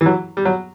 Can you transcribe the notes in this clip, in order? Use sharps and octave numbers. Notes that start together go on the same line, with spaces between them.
E3
F#3
G3
F#3